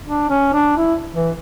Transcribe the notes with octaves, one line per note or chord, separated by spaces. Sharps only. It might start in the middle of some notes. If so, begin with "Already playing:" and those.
D4
C#4
D4
E4
E3